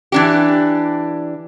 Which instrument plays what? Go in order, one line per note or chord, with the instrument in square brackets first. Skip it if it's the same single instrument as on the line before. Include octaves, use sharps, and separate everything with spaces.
[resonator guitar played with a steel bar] E3 D4 G4